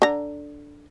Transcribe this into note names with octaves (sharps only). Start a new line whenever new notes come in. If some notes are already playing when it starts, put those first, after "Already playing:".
D3 A#5